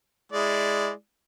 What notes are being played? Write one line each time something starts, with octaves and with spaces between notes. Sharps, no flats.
G#3 E4 D5